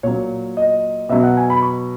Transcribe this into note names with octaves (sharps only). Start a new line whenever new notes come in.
A#2 F#3 C#5
D#5
B2 F#3 E5
F#5
G#5
B5
C#6